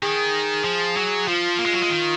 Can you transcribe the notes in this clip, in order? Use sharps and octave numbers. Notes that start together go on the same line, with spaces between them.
D#3 G#4
F3
F#3
F3 F4
A#3
G#3
F#3
G#3
D#3